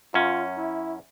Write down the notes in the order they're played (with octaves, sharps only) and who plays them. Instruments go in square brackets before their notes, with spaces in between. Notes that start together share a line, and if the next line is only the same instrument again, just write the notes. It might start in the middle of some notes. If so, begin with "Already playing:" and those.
[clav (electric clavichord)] F#2 C#4 [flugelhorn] F4
[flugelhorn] E4